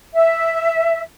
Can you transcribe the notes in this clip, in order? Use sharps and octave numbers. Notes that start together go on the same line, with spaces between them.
E5